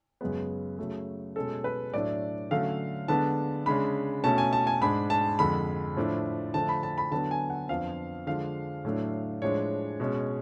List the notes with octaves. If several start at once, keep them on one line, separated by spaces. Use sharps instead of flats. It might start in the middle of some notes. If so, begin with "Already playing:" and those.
F#2 C#3 G#3 B3
C#3 F#3 A3
B2 G#3 C#4 A4
B4
A2 F#3 A3 D4 D5
D3 F#3 A3 C#4 F5
D3 G#3 B3 D4 A5
C#3 G#3 D4 B5
B2 A3 C#4 A5
G#5
A5
G#5
G#2 G#3 D4 B5
A5
F2 D3 G#3 B5
A2 F3 A3 D4
D3 F3 A3 D4 A5
B5
A5
B5
D3 F#3 B3 D4 A5
G#5
F#5
F2 F3 B3 D4 F5
D3 F3 G#3 D4 F5
A2 F#3 A3 D4
A2 F3 G#3 D4 C#5
B2 G#3 C#4